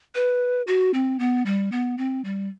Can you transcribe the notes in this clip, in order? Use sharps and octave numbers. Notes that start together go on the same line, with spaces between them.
B4
F#4
C4
B3
G3
B3
C4
G3